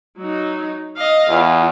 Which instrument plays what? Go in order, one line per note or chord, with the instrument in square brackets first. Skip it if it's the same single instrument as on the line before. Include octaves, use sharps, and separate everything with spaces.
[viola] F#3 D#4
D#5 F5
[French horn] E2 [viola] F4